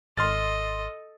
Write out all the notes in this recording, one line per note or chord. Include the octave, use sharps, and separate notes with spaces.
G#1 A4 D#5 C6 F6 A6